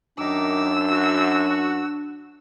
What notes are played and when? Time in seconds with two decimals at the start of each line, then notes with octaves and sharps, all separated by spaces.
0.19 F#2 D#3 D4 D#4 D6 E6
0.91 F#4